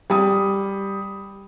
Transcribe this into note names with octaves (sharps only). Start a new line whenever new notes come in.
G3 D#6